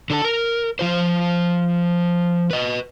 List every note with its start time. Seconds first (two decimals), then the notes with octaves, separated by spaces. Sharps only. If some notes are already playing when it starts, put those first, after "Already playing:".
0.10 D3 A4 A5
0.24 A#4
0.79 F3 F4 C5
2.51 B4 D#5